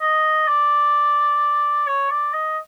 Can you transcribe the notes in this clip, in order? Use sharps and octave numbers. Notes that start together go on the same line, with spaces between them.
D#5
D5
C#5
D5
D#5